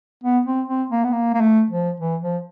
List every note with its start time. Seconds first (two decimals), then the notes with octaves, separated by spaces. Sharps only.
0.24 B3
0.46 C4
0.68 C4
0.90 A#3
1.04 B3
1.12 A#3
1.34 A#3
1.41 A3
1.70 F3
2.00 E3
2.22 F3